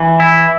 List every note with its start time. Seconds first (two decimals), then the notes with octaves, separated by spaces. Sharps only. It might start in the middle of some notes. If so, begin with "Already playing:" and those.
Already playing: E3
0.20 E4